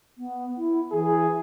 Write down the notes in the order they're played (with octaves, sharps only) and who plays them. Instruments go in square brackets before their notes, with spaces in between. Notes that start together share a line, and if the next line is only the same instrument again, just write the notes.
[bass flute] B3
E4
[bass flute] E3 [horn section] G#4